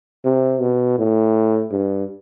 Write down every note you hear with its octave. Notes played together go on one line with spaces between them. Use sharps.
C3
B2
A2
G2